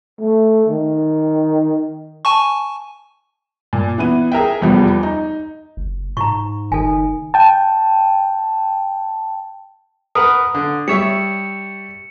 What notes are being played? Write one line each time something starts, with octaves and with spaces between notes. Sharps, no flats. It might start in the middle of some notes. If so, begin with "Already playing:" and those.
A3
D#3
G#5 A5 C#6
A#2
E3 B3 D#7
G#4 A#4 E5 G5
F1 E2 F3 G3 B3
D#4
F#1
G#2 A#5 C#6
F#1 D#3 A4 G#5
G5 A5
A#4 B4 F#5 D#6
D3
G3 C#5 E5 C#7 E7